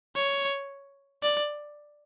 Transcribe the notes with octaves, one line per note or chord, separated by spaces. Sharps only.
C#5
D5